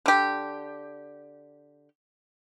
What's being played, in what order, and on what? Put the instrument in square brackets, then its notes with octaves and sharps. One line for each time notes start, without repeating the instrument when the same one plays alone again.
[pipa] D3 G4